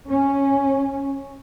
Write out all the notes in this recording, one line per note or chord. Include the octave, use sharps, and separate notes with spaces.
C#4